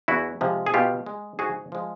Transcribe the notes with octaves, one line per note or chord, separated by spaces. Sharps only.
E2 E4 F#4
C3 F3 G#3
G#4
B2 F4 G4
G#3
G#2 F#4 G#4
F3 G#3